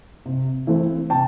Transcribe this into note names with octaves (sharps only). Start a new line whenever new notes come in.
C3
E3 A3 C4
C3 G5 A5